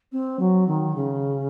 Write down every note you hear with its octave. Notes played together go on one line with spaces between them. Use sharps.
C4
F#3
D#3
C#3